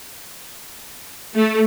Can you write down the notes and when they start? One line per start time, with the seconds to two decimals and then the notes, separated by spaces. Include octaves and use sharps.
1.36 A3